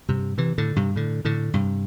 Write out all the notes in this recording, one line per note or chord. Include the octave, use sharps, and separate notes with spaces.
G2 C3
C3 E3
A2 D3
G2 C3
A2 D3
A2 D3
G2 C3